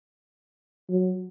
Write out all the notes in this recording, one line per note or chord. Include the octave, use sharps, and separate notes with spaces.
F#3